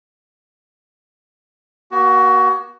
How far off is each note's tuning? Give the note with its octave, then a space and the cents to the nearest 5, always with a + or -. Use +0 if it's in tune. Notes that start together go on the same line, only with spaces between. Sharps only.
A#3 +45 F#4 +20